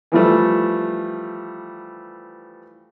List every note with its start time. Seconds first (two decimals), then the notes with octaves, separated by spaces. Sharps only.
0.12 E3 F3 G3 A3